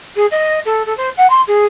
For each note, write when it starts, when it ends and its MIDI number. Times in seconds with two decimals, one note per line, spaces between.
0.16 0.26 68
0.31 0.59 75
0.65 0.83 69
0.86 0.96 69
0.97 1.10 72
1.17 1.27 78
1.30 1.42 84
1.48 1.66 68